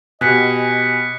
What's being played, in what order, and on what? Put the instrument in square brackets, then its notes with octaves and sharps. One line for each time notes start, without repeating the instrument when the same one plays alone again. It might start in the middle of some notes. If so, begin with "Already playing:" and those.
[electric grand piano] B2 G4 [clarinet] D#5 [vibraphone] G#5 [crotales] F#6 B6 C#7